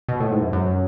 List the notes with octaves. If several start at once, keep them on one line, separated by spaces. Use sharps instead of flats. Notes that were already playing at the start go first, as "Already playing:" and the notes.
B2
A2
G#2
F#2
F#2